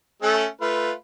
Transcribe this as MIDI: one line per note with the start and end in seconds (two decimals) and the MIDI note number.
0.22 0.46 57
0.22 0.46 61
0.22 0.46 69
0.61 0.92 57
0.61 0.92 65
0.61 0.92 71